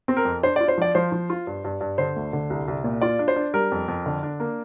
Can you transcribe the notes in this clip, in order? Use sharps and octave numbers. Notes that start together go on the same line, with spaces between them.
C4
A#4
F2
D4 C5
D5
F4
C5
F3 D5
F3 C5
F3
F4
G2
G2
G2
D3 C5
D2
D3
C2
C2
A#2
F4 D5
D4
C5
D4
G3 A#4
F2
F2
D3
D4
A#3